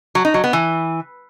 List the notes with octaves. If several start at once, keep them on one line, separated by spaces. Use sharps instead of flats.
F#3
D#4
F#3
B3
E3